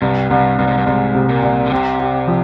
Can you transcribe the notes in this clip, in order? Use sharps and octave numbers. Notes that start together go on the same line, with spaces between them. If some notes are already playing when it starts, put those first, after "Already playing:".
C2 G2
C2 G2
C2 G2
G#2
G2
C2 G#2
C3
A#2
C2
D3
C3 G4
G4
F3